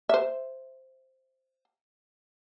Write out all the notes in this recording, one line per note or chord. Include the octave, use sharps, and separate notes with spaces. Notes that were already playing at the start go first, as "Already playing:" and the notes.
C5 E5